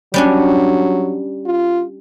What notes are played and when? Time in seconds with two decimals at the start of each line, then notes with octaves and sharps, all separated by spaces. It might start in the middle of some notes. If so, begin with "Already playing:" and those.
0.14 F#3 G3 C#4 D4
1.46 F4